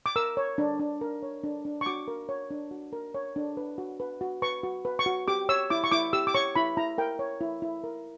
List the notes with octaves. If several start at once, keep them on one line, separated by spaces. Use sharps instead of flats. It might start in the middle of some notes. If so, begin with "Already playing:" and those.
D6
A#4 E6
C#5
D4
D4
A#4
C#5
D4
D4
C#6
F#4 D6
A#4
C#5
D4
F#4
A#4
C#5
D4
B4
F#4
B4
F#4
B4 C#6
F#4
B4
C#6
F#4
G4 D6
C#5 E6
E4 D6
C#6
E4 D6
G4 E6
D6
C#5 C#6
E4 B5
E4 A#5
A#4 G5
C#5
E4
E4
A#4